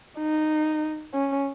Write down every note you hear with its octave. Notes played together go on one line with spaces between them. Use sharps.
D#4
C#4